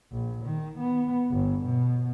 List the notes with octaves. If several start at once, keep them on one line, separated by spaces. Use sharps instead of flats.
A#1
D#3
B3
G1
B2